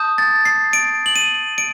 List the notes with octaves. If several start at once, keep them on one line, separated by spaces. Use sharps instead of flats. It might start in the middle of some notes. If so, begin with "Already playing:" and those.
Already playing: A5 D#6 G6
A6
C7
D7
F#7
D#7
D7